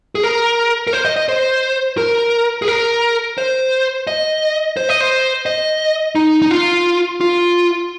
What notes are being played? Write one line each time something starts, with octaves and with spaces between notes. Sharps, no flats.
G#4
A#4
A#4
C5
D#5
D#5
C5
A#4
G#4
A#4
C5
D#5
C5
D#5
C5
D#5
D#4
D#4
F4
F4